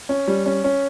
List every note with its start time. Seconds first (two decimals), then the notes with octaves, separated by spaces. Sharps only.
0.09 C#4
0.28 G3
0.46 C#4
0.64 C#4